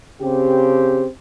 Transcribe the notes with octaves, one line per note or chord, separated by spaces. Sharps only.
C#3 C4 G4